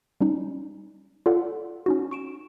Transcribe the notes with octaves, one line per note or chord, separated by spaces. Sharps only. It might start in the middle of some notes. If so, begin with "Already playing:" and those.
G3 C#4 D#4
F4 A4 D5 F5 F#5
C#4 D#4 F#4
C#6 D7 E7